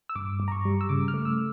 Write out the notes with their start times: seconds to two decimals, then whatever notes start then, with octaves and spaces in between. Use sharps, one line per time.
0.09 E6
0.16 G2 D6
0.40 G2
0.48 A#5
0.52 C#6
0.65 G3
0.81 E6
0.89 C#3 D6
1.08 F6
1.14 A3
1.25 E6